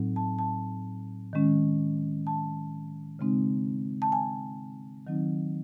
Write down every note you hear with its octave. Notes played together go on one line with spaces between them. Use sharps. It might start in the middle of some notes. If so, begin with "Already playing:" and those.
Already playing: A2 F#3 C4 D#4
A5
A5
D#3 G#3 C#4
A5
C#3 G#3 C4 D#4
A5
G#5
D#3 F#3 C4 D#4